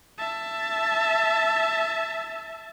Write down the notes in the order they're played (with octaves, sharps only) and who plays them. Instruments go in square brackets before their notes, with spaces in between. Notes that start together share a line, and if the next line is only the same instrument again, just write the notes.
[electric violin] E5 A5